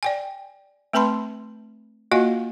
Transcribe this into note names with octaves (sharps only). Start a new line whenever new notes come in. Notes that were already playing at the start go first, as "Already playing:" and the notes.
D5 G5 G#5
A3 C4 B4 A5 B5 C6
A#3 F4 F#4 D#5 F5 G#5